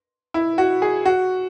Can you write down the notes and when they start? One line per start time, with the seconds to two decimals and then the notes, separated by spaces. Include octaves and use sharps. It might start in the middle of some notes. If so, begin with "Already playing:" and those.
0.34 E4
0.58 F#4
0.82 G#4
1.05 F#4